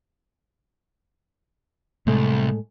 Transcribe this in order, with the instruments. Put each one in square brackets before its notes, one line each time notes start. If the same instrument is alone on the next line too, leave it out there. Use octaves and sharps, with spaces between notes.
[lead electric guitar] C2 [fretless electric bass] A2 G#3 A3